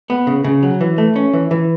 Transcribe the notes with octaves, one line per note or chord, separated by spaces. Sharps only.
B3
C#3
C#3
F#3
E3
A3
C#4
E3
E3